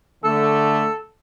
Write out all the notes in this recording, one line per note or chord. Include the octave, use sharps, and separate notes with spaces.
D3 A3 A4